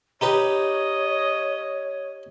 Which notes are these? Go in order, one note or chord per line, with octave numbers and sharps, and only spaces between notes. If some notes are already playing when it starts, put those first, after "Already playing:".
D#4 G4 B4 C#5 D#5